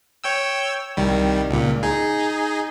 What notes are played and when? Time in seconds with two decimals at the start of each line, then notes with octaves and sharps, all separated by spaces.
0.24 C#5 G5 E6
0.97 C2 D#3 G3
1.50 C#2 A#2
1.83 D#4 G#4